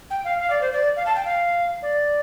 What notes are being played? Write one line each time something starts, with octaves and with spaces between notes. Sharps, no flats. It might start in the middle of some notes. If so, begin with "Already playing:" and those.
G5
F5
F5
D5
C5
D5
F5
A5
G5
F5
D5